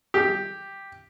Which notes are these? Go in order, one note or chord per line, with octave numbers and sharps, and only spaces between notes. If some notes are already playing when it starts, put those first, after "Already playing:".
G4